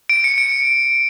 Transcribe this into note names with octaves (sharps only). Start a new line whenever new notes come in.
D7
C#7
D7